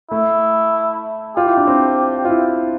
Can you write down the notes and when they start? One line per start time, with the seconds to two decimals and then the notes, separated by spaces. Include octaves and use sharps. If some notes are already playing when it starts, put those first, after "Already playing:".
0.11 A3 E4
1.36 F4 G4
1.47 E4
1.57 D4
1.67 C4
2.25 F4
2.29 E4